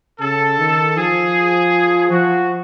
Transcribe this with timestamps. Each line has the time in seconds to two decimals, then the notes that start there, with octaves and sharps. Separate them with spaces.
0.20 C#3 A4
0.59 D#3
0.97 F3 G#4
2.11 F3 F#4